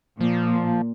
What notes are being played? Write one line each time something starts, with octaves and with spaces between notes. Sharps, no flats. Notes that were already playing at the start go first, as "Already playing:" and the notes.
A#2 F3